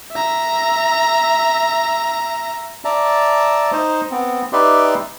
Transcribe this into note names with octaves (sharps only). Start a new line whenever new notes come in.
E5 A#5
D5 E5 A5 A#5
D#4 C5 D#5
B3 C4
D#4 G4 B4 D5 E5 C6